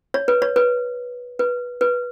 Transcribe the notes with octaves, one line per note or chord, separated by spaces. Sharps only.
C#5
B4
C#5
B4
B4
B4